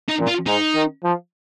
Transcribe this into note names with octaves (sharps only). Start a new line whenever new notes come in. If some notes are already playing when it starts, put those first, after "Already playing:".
D#4
A#2
F4
G#2 D#4
D#3
F3